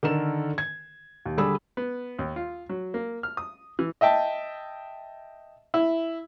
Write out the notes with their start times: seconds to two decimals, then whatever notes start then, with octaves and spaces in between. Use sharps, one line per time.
0.03 D3 D#3 A4 A#4 E7
0.58 G#6
1.26 D#2
1.37 D3 G3 G#4 B5 E6
1.77 B3
2.19 D#2
2.36 F4
2.69 F#3
2.94 A#3
3.23 F6
3.37 D#6
3.79 E3
4.01 D#5 E5 G5 A5
5.74 E4